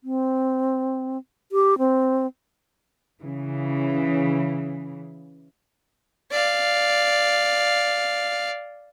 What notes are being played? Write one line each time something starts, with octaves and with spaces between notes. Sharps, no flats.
C4
G4
C4
C#3 E3
D5 F5